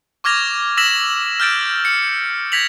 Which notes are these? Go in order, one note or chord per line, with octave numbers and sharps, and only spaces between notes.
C#6 D6 F6 G#6 A#6 F7
E6 A#6 B6 E7 F#7
F6 G6 A6 D7
C#7
G#6 A#6 B6 F7 F#7